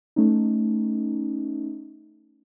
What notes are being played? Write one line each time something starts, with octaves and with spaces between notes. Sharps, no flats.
A3 C#4 D#4